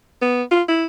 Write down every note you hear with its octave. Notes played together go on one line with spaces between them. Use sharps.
B3
F4
E4